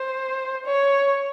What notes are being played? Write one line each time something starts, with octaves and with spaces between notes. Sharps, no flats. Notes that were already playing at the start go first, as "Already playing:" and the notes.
Already playing: C5
C#5